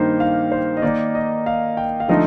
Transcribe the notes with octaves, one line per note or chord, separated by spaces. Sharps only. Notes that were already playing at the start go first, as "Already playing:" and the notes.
Already playing: G2 D#3 A#3 D#4 G4 C5
F5
C5
D#5
D#3 A#3 D#4 D5
D#5
F5
G5
F5
D3 F3 A3 D#4 D#5